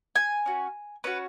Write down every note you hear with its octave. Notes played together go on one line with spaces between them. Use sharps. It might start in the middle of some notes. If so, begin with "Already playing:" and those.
G#5
C#4 F#4
C#4 F#4 B4